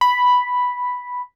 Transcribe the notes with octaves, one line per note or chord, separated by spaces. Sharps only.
B5